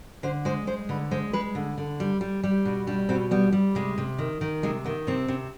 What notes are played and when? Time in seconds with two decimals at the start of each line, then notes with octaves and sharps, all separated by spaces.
0.23 D3 C5
0.45 G#3 C5
0.67 G#3 C5
0.89 D3 B4
1.11 G#3 C5
1.33 G#3 B4
1.55 D3
1.78 D3
2.00 G3
2.21 G3
2.43 G3 G4
2.65 B2 D4
2.87 G3 D4
3.09 B2 C4
3.31 G3 B3
3.53 G3
3.75 C3 G#3
3.98 C3
4.19 D#3
4.41 D#3
4.63 C3 G#3
4.84 D#3 B3
5.07 C3 C4
5.28 C3